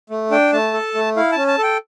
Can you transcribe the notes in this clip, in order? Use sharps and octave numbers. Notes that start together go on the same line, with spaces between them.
A3
D4 G5
A3 A5
A4
A3
E4 F5
C#4 A5
A5
A4 G5